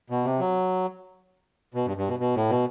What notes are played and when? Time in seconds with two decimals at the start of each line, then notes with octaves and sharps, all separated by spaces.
0.10 B2
0.24 C3
0.39 F#3
1.74 B2
1.86 G2
1.97 G2
2.08 B2
2.19 B2
2.35 A2
2.50 B2